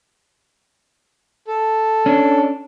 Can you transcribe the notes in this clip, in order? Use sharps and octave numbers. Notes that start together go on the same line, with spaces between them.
A4
C#4 D4